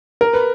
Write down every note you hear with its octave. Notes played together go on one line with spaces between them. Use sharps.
A#4
B4